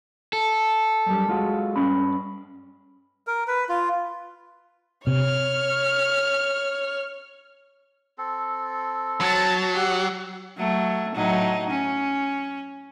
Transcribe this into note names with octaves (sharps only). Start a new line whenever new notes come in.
A4
F#2 G3
G#3 F4 F#4
G2 C#4 B5
A#4
B4
F4
C3 C#5 F6
C4 A4
F#3 A5 A6
G4 F#5
F#3 A3
A2 F#3 D#4
C#4